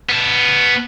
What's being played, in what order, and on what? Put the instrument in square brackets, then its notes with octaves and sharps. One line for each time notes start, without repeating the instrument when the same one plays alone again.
[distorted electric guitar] B3 A5